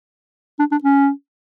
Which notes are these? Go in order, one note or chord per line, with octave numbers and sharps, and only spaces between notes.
D4
D4
C#4